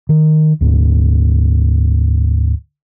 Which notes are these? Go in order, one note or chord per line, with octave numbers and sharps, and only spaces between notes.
D#3
D2 G#2